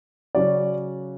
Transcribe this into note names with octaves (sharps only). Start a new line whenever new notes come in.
C#3 F#3 C#4 D5